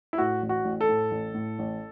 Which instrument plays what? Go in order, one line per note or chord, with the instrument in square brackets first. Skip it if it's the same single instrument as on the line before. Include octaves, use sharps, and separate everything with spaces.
[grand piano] E4
A2 F#4
A1
F#4
A1
A4
A2
A1
A2
A1